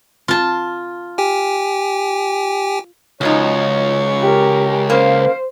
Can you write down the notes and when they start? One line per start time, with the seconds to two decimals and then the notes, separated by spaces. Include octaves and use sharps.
0.28 F4 A5
1.18 G4 G5 G#5
3.21 C#2 F3 F#3 D#4 C#5
4.21 G4 A#4
4.90 C#3 A#3 C5